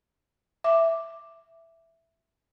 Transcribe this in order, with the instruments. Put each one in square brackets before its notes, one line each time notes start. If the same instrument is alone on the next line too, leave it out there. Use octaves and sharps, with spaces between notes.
[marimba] E5 D6